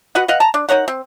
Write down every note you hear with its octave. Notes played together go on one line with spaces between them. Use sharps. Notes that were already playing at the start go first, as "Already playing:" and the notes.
F#4 B4 D#5 F#5
B4 D#5 F5 F#5
A5 A#5
D4
D#4 A#4 C#5 F#5
C4